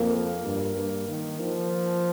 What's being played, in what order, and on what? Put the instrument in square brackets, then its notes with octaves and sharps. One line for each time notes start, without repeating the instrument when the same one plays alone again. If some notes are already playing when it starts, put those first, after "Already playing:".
Already playing: [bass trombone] F2 [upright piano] A#3
[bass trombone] G2
G2
D#3
F3